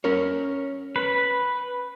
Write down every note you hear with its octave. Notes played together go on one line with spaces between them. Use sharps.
C#4 A#4 C#5
B4